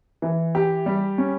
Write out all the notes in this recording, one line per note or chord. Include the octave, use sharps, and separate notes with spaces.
E3
G4
G3
C#4